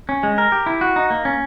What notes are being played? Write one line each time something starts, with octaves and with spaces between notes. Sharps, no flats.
C#4
G#3
A#4
G4
E4
F#4
D#4
A#3
C#4